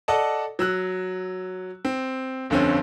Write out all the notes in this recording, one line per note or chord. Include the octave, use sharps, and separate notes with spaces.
A4 D5 D#5 F#5 A5
F#3 E6 F#6
C4
G1 F2 D3 C4 C#4